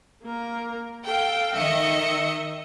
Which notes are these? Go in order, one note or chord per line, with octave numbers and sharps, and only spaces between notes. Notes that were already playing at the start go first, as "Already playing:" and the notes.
A#3 A#4
A4 F5 G5
D#3 D#5 E5 C#7